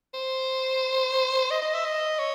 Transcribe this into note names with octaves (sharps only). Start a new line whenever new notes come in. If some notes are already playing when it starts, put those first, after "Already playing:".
C5
D#5
D#5
E5
D#5
C#5